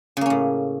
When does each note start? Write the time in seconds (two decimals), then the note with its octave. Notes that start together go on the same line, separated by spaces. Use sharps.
0.17 C#3
0.21 A#3
0.26 C#4
0.30 A2